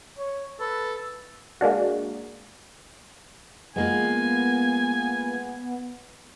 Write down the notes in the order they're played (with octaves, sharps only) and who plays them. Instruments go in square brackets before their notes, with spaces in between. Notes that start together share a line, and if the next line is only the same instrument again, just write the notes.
[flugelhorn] C#5
[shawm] A4 [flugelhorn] B4
[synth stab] G#3 A#3 D4 F#4
[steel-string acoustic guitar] G#3 A#3 F4 [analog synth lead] B3 [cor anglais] G#5